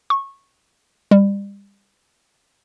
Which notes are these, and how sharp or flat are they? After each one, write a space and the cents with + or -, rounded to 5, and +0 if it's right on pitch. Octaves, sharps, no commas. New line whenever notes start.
C#6 -15
G3 +30